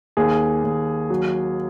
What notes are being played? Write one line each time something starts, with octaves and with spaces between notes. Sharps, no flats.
D#2 G#4
D#2
F#3